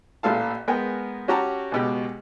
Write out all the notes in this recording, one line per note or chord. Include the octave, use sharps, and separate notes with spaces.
A1 A#2 A4 F5 A5
G#3 B3 A#4 B4 G5 G#5
C#4 F#4 G4 A5 A#5
C#2 B2 G4